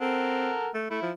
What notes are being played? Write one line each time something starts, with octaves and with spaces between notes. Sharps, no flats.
C4 A4 A#4 F#5
A3
A3 E4
F3